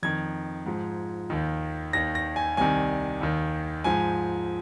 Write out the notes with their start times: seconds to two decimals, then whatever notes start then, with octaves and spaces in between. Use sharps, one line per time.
0.03 F2 D#3 G#6
0.66 G#2 F3
1.30 D#2 D#3
1.93 D#2 D#3 A#6
2.15 A#6
2.36 G#5
2.57 C2 C3 D#3 G#5
3.21 D#2 D#3
3.84 G#2 F3 G#5